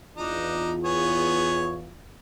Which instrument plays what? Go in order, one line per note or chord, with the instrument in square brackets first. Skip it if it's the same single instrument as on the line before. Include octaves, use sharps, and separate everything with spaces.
[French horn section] E2 F4 [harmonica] D4 D#4
[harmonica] B3 G#4 C#5